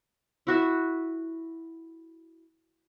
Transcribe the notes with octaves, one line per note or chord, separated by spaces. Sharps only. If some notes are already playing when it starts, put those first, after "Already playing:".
E4 F#4 E5